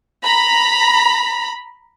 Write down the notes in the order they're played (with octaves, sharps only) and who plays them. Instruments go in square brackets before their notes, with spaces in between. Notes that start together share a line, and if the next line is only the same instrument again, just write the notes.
[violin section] A#5 B5